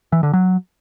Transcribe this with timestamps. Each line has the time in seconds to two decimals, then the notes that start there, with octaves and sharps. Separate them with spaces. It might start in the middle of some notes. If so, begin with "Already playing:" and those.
0.12 E3
0.23 D3
0.33 F#3